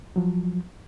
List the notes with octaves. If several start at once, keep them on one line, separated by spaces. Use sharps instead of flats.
F3 F#3